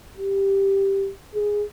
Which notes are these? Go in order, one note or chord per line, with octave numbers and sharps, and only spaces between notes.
G4
G#4